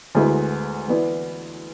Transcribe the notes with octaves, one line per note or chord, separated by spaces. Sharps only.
D2 D3 G#3 B3 E4
E3 B3 E4 B4 D5